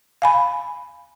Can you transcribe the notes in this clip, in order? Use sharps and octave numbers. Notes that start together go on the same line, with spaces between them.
F5 G#5 B5